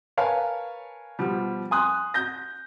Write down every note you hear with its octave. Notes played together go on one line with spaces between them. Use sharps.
A#4 B4 C#5 F5 G#5 A5
B2 F3 G3
G#5 C6 D#6 F#6
G6 A#6